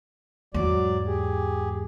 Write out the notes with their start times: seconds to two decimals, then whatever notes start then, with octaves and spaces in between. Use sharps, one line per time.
0.54 E2 G#2 F#3 D5
1.06 G4 G#4